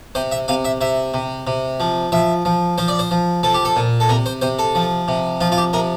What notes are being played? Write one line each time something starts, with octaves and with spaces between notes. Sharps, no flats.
C3 C5
E5
C3 F5
E5
C3 E5
C3
C3
F3
F3 E5
F3
F3 C5
D5
C5
F3
F3 A4
G4
A4
A#2
A4
C3 A#4
C5
C3 C5
A4
F3
C3
F3 F4
F4
G4
C3 A#4